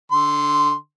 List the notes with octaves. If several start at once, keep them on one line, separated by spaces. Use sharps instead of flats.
D3 C6